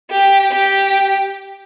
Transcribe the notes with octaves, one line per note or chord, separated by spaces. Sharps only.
G4
G4